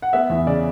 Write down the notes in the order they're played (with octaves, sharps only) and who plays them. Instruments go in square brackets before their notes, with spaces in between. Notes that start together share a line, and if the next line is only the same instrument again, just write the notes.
[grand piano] F#5
B3 E5
E2
C#3 D5